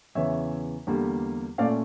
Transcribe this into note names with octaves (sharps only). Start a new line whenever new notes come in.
E2 C#3 E3 C#5 E5
E2 D3 G3 A#3
A#2 A3 C#4 D5 F5